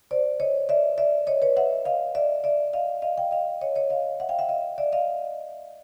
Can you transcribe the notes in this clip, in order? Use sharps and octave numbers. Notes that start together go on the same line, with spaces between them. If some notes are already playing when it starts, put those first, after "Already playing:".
C5 D5
C#5 D#5
D5 E5
D5 E5
C#5 D#5
B4 C#5
E5 F#5
D#5 F5
D5 E5
D5 E5
D#5 F5
D#5 F5
F5 G5
D#5 F5
C#5 D#5
C#5 D#5
D#5 F5
E5 F#5
F5 G5
E5 F#5
D#5 F5
D5 E5
D#5 F5